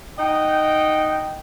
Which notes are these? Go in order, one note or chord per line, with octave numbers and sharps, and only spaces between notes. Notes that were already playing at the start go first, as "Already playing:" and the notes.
D#4 D#5 F#5 G5